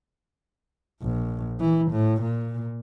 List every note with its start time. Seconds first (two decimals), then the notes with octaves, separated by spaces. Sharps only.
1.02 A#1
1.60 E3
1.91 A2
2.21 A#2